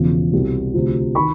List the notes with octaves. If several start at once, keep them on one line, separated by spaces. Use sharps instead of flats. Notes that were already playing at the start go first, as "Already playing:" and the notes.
Already playing: E1 E2 C#3 F3
C2 B2
D2 C3 F3
D#3 B5 C#6